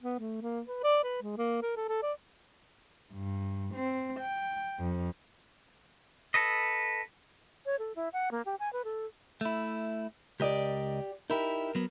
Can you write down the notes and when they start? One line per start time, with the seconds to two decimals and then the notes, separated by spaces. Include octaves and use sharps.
0.03 B3
0.19 A3
0.42 A#3
0.67 B4
0.84 D5
1.03 B4
1.23 G#3
1.38 A#3
1.63 A#4
1.77 A4
1.89 A4
2.03 D5
3.13 G2
3.75 C4
4.20 G5
4.80 F2
6.34 A4 B4 D#5
7.66 C#5
7.79 A4
7.96 E4
8.13 F#5
8.31 A#3
8.45 G4
8.60 G#5
8.73 B4
8.84 A4
9.41 A3 E4
10.40 C#2 G4 A#4 D5 D#5
11.30 D#4 E4 G4 A#4
11.75 F#3 B3